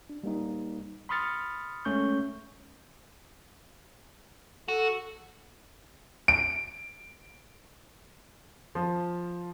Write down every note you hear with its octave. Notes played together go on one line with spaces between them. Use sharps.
D4
G3 A#3 D#4
B5 C6 D#6 F6 A6 C#7
G#3 A3 C#4 C#6 G6
F#4 A4
D7
F3